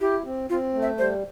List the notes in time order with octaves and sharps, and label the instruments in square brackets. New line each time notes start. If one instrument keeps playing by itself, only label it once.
[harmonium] E4 [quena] G4
[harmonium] C4
[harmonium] C4 [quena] F4
[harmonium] A3
[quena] E5
[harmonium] G3 [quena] C5